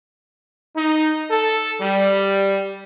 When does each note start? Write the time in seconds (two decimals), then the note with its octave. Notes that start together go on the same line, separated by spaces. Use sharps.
0.76 D#4
1.31 A4
1.80 G3